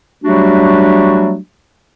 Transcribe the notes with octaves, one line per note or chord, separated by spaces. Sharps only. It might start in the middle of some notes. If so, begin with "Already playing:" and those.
F#3 G3 A3 D4 F#4 G4